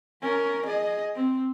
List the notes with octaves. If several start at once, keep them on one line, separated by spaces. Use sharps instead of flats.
C#4 A#4
G#4 D#5
C4